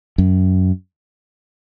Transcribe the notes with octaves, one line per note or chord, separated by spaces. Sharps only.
F#2